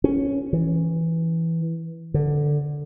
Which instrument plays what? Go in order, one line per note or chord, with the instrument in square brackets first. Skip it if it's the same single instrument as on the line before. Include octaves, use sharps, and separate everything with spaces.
[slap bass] C#4
E3
D3